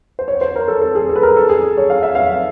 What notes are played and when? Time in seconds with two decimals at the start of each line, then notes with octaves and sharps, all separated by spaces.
0.19 C5
0.28 C#5
0.41 C5
0.56 A#4
0.68 A4
0.82 A4
0.95 G#4
1.09 A4
1.16 B4
1.23 A#4
1.37 A4
1.49 G#4
1.77 C#5
1.90 F5
2.03 E5
2.15 F5